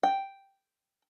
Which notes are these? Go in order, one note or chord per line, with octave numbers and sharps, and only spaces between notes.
G5